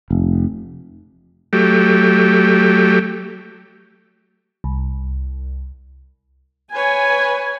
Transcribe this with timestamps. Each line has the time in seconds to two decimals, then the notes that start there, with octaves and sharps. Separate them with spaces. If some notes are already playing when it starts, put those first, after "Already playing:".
0.11 F1
1.53 F#3 A3 G4
4.64 C2
6.73 B4 C#5 G#5